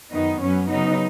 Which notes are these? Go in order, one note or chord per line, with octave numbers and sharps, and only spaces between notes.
F#2 D#3 B3 D#4
F#2 F#3 B3 C#4
C#3 F#3 B3 D#4